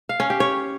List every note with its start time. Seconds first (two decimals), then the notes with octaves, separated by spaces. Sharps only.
0.09 F5
0.20 C#4
0.30 G4
0.40 C#5